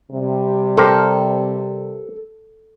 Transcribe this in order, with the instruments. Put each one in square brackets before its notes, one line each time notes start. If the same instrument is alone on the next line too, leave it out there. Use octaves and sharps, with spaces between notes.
[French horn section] C3 G3
[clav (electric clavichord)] G4 A#4 C5 [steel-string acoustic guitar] A4